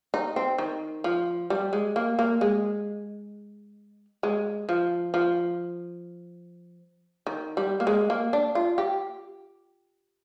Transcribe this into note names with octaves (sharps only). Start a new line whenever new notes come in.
D#4
C4
D#3
F3
G3
G#3
A#3
A#3
G#3
G#3
F3
F3
D#3
G3
A#3
G#3
A#3
D4
F4
G4